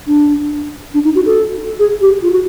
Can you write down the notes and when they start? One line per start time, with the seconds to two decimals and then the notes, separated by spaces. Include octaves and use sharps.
0.07 D4
0.94 D4
1.04 D#4
1.15 F#4
1.26 A4
1.79 G#4
2.01 G4
2.22 F4
2.31 F#4